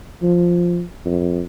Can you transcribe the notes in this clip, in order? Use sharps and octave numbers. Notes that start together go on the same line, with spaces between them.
F3
F2